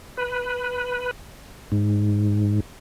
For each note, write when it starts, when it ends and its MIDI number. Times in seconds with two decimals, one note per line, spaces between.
0.17 1.11 71
1.72 2.60 44